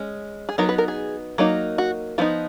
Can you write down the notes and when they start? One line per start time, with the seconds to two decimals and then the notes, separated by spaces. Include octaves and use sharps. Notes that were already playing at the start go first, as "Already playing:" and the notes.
Already playing: G#3 C#4
0.49 G#4
0.58 F#3 B3 D#4 A#4
0.69 B4
0.78 A#4
0.88 G#4
1.38 F#3 A#3 D#4
1.78 F#4
2.18 F3 B3 D#4 F4